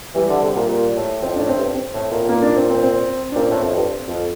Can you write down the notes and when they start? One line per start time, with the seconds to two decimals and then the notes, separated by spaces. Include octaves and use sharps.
0.15 E3 G3
0.29 D3
0.43 C3
0.56 A#2
0.69 A#2
0.96 A2
1.22 F2 C4
1.36 A2 D4
1.49 C4
1.58 G2
1.75 C4
1.94 A2
2.11 A#2
2.29 A#3
2.42 D4
2.57 C4
2.69 C4
2.83 C4
3.32 D4
3.36 A#2 C4
3.50 A2
3.63 F2
3.76 G2
4.08 F2